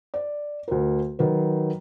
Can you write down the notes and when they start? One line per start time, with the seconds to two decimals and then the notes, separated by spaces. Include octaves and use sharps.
0.14 D5
0.68 D2 A#4
1.19 D#3 F#3 B4